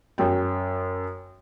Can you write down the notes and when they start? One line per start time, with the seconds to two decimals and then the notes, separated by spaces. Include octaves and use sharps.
0.18 F#2 G5